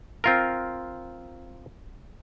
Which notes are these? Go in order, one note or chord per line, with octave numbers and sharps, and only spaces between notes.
C4 F4 A#4